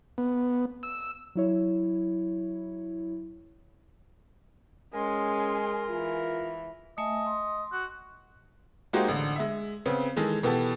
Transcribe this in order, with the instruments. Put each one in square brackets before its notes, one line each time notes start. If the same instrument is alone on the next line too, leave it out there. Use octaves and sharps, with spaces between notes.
[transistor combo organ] B3
E6
[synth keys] F#3 E4 C#5
[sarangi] G#3 [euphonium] C#4 [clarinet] A#4 [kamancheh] G#5 C6
[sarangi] E3 [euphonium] F4
[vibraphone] A3 E5 G#5 [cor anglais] D#5
[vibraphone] C6
[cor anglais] F#4
[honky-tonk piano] G#3 A#3 D#4 F#4 G4 C5
A1 D3
G#3 E5
C#3 B3 C4
D#3 E3 G#3 G#4 A4
B2 E3 B3 G4 A4